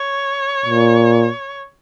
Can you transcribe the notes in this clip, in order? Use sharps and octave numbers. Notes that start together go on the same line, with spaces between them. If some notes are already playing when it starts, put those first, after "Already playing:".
Already playing: C#5
A#2